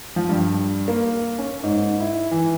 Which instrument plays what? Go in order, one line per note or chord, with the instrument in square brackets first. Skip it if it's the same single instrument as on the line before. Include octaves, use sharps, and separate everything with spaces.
[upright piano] F3
G2
A#3
C#4
G#2
E4
E3